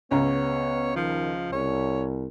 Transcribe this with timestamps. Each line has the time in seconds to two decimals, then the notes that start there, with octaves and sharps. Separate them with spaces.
0.11 C#2 B3 C#5 A#5
0.96 D#3 F3
1.52 C2 C#5